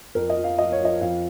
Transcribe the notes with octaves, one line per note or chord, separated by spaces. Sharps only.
F2 A#4
D#5
F3
F5
F3 D#5
C#5
F3 D#5
F2 F5